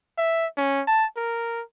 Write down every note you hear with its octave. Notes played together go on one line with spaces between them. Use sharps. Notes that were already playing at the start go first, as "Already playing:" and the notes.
E5
C#4
A5
A#4